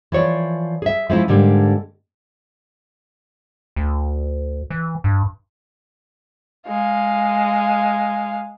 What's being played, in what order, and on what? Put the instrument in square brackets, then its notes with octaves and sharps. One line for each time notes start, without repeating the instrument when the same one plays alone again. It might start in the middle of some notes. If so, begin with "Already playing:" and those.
[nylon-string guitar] E3 F3 C#5 D5
G#4 E5
F3 G#3 C#4 E4
G#2 D3 G3 G#3 A#3
[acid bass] D2
E3
G2
[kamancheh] G#3 F5